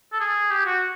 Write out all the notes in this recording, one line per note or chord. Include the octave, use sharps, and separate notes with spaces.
A4
G#4
G4
F#4